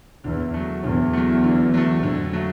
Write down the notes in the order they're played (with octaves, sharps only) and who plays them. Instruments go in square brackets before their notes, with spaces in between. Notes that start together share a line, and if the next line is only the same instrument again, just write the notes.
[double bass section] E2 [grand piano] D3
[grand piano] F#3 A3
[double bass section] E2 [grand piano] D3
[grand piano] F#3 A3
D3
F#3 A3
[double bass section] F2 [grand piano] D3
[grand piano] F#3 A3